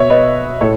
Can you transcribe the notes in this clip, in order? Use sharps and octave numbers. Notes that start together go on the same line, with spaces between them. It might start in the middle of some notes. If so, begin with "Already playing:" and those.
Already playing: B2 C#5 E5
B4 D#5
A2 A4 C#5